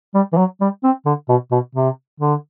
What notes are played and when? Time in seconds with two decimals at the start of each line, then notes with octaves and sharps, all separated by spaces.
0.14 G3
0.33 E3
0.37 F#3
0.61 G3
0.84 C4
1.06 D3
1.29 B2
1.51 B2
1.75 C3
2.20 D3